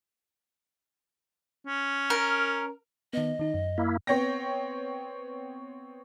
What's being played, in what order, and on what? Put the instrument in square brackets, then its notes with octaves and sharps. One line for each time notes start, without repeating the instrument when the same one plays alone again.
[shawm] C#4
[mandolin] A#4
[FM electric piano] D#3 B3 [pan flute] D#5
[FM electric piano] D#3 D#4
F#2
[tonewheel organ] A#3 E4
[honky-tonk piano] B3 C4 C#5 G5 A#6